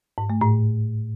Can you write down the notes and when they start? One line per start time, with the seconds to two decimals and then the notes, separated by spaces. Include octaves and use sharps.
0.18 G#2
0.30 A3
0.41 A2